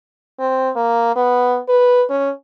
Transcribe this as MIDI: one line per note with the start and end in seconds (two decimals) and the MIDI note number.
0.39 0.70 60
0.76 1.15 58
1.16 1.60 59
1.69 2.05 71
2.10 2.31 61